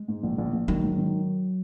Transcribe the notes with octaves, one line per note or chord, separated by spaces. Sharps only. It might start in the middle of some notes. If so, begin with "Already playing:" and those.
Already playing: G#3
G#2
A#1
A#1
A#1
D#3 F#3
G#2
D#3